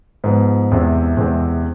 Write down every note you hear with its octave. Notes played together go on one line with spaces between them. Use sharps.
G#2 F3 B3
E2 C3 G#3 C4
E2 C3 G#3 C4